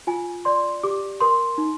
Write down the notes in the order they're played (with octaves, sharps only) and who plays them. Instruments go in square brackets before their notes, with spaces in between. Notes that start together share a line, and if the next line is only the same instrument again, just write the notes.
[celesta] F4 G#5
D5 C6
G4 D6
A#4 C6
D#4